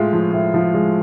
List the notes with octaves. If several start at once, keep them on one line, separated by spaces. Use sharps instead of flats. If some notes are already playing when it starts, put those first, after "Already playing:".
Already playing: A2 G#3 F4
F3
A2
F3
G#3